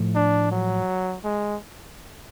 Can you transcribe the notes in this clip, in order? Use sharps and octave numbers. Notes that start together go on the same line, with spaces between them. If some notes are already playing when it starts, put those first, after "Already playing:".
Already playing: A2 F3 A3
D4
F#3
G#3